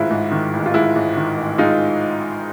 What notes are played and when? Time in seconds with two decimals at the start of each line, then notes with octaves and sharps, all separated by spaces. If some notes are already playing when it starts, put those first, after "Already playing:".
Already playing: A1 G#2 D#3 G#3 E4 F4
0.10 G#2
0.31 D#3
0.53 A1
0.66 F4
0.74 G#3 E4
0.96 G#2
1.17 D#3
1.37 A1
1.58 G#3 D#4 F4